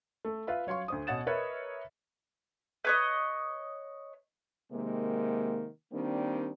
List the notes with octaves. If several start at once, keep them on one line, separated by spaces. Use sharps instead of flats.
A3
F4 B4 E5 F5 B5
F#3 C#5 F5 C6 C#6
D2 C5 D#6
B2 C#5 F#5 A6 E7
A#4 B4 C#5 D#5 E5
B4 C#5 D#5
C3 D#3 G#3 A#3
D#3 G3 A#3 C4 D4